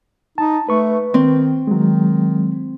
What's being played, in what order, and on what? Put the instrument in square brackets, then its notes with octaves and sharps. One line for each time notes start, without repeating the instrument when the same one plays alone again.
[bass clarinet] D#4 [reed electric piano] A5
[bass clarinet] A3 [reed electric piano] B4 C#6
[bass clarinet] D#3 [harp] C4
[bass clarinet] D#3 [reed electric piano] F#3 G#3